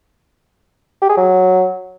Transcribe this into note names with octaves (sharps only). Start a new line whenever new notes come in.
G4
G#4
F#3